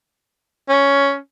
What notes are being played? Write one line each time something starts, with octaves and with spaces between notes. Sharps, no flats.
C#4